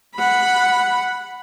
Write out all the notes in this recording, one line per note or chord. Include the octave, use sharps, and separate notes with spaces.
F#5 B5